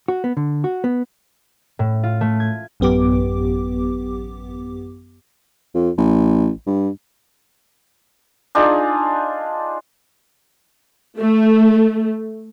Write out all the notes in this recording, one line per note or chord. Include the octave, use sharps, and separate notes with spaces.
F#4
B3
D3
F#4
B3
A2
F4
A3
G#6
A1 F#2 B3 G4 D6
F2
A1
G2
D4 D#4 F4 G#4
A3